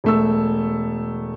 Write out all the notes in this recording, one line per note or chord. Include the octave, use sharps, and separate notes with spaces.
E1 A3 E6